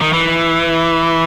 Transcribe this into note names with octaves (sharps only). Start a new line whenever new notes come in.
D#3
E3